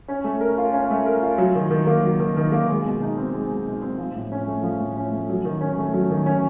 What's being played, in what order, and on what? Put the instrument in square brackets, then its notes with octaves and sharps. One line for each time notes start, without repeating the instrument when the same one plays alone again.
[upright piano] C#4
A3
A#4
F4
C#4
A3
A#4
F4
F#3
D#3
D#3
A#3
F#3
D#3
D#3
A#3
G#3
B2
D#4
C4
G#3
B2
D#4
C4
F3
A2
C#4
A3
F3
A2
C#4
A3
F#3
D#3
C#4
A3
F#3
D#3
C#4